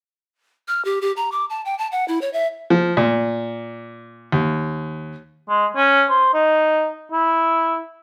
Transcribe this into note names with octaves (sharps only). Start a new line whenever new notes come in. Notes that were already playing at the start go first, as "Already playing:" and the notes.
F6
G4
G4
A#5
D6
A5
G5
A5
F#5
E4
C#5
E5
F3
A#2
D#2
G#3
C#4
C5
D#4
E4